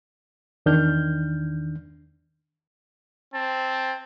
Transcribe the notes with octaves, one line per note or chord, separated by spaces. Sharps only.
E2 D#3 D4 F6 G6
C4 A5